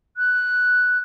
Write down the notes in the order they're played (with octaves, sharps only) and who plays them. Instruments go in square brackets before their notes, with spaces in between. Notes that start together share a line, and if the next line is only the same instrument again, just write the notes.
[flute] F#6